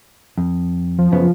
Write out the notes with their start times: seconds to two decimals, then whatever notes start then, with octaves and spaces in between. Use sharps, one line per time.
0.38 F2
0.99 F3
1.12 F#2 C#3 B3